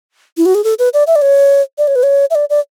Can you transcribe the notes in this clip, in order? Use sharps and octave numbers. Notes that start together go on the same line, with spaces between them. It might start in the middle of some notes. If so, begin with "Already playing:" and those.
E4
F#4
G#4
A4
B4
D5
E5
D5
C#5
D5
C#5
B4
C#5
E5
D5
D5